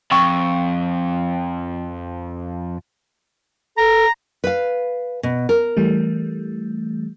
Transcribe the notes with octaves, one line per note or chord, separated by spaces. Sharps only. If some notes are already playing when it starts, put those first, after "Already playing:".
F2 G5 C#6 E6
A4 A#5
B4 F5
B2
A#4
E3 G3 A3